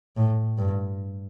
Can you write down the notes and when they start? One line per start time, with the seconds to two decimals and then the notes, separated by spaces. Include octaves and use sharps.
0.17 A2
0.58 G2